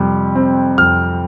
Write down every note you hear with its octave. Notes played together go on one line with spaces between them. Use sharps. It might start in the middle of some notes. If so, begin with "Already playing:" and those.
Already playing: F2 C3 G3
C4
F2 F6